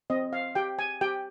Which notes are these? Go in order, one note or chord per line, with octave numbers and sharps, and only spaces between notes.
C4 D#5
F5
G4 G5
G#5
G4 G5